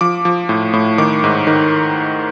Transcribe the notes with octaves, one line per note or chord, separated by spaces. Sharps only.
F3 D6
F3
A2
A2
D#3 D6
G#2
D#3